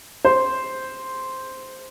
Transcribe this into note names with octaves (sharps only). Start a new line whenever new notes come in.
C5